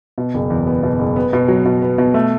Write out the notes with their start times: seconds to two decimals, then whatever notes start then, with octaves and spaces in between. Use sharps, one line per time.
0.18 B2
0.34 F#1
0.50 E2
0.67 B3
0.83 B2
0.99 F#1
1.16 B3
1.33 B2
1.48 F#3
1.65 B2
1.82 B3
1.98 B2
2.14 A3